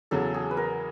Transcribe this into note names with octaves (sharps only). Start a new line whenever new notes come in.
E2 C#3 F#3 A4
G#4
B4
A#4